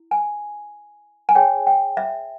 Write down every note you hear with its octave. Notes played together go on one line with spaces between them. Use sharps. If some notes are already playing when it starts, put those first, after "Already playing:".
Already playing: E4
G#5
G#5
D#4 G#4 C#5 G5
G5
E5